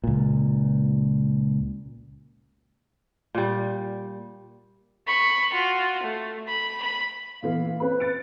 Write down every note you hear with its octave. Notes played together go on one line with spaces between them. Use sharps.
C#2 A#2
A#2 G3
B5 C#6
F4 F#4
A3
B5
B5
A#2 E3 B3 F5
C4 C#4 B4 B5
A6 C#7 D7